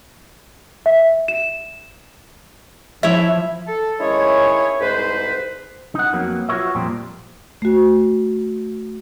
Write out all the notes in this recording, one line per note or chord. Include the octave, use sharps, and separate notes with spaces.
E5
E7
F3 E4 C#5 E5
A4
D#3 G#3 C#4 E4 G#4 C#5
C2 G#2 B4 C5
D#4 F#5
F2 F#3 A#3 B3
F4 F#4 A#4 B4 C#5 E5
F2 A#2 G3 C4
A3 F#4